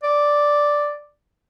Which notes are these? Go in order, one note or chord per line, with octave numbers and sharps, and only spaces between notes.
D5